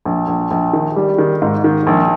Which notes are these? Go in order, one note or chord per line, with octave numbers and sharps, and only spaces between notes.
A#1
A#1
A#1
D#3
G3
D#3
G#2
D#3
A#1